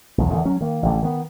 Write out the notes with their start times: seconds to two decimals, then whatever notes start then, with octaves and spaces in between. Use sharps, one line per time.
0.18 B1 E2
0.30 E2 D3 D#3
0.45 F#3 C#4
0.61 D#3 A#3
0.83 A1 D3
1.03 D#3 B3